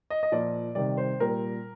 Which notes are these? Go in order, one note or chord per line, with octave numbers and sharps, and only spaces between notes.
D#5
D#5
A#2 F3 D5
C3 D#3 G3 D5
C5
A#2 G3 A#4